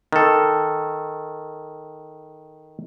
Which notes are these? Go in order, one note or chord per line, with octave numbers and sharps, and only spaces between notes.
D#3 A4